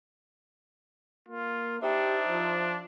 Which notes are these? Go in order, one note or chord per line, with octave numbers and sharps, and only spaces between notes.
A#3 F4
D4 D#4 G4 C5 E5
F3